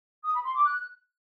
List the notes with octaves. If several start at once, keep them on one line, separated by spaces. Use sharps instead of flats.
D#6
B5
C6
D6
F#6